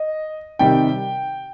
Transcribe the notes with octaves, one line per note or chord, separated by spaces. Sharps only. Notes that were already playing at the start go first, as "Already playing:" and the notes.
Already playing: D#5
C3 D#3 G3 G5